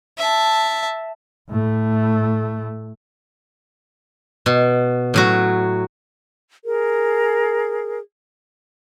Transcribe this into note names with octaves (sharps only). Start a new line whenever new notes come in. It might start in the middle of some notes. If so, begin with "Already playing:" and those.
E5 A5
A2 A3
B2
A2 F#3 F#4
G#4 A#4